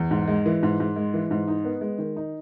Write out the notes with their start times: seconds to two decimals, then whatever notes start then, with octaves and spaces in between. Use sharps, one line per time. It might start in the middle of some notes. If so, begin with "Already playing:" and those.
Already playing: E2
0.11 G#2
0.28 G#3
0.46 E3
0.63 G#2
0.80 G#2
0.96 G#3
1.14 E3
1.31 G#2
1.48 D#4
1.64 B3
1.81 G#3
1.98 D#3
2.16 D#4